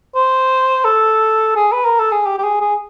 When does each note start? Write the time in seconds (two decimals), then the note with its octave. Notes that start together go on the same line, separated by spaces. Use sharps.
0.15 C5
0.84 A4
1.56 G#4
1.72 B4
1.85 A#4
1.99 A4
2.12 G#4
2.26 G4
2.39 G4
2.44 G#4
2.61 G#4